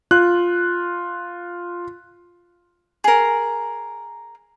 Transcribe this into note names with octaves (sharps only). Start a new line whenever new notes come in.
F4 F#6
G#4 A#4